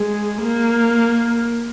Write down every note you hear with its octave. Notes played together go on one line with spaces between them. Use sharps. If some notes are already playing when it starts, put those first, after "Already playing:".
Already playing: G#3
A#3